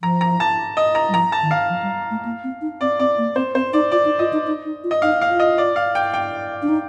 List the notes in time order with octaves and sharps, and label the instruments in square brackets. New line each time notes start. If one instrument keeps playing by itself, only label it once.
[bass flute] F3 [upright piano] A#5
[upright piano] A#5
A5
D#5
A#5
[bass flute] G3
[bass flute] F3 [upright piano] A#5
[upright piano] A5
[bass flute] D#3
[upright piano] F5
[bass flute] F3
G3
A3
A#3
C4
D#4
[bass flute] C4 [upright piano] D5
[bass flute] C4 [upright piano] D5
[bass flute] A#3
[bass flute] C4 [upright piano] C5
[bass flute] C4 [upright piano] C5
[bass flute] D#4 [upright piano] D5
[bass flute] F4 [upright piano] D5
[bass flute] D#4
[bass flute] F4 [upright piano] D#5
[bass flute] D#4
D#4
D#4
F4
[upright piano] D#5
[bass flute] D#4 [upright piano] F5
[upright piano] F5
[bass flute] F4
[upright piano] D#5
D5
F5
G5
G5
[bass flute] D4
D#4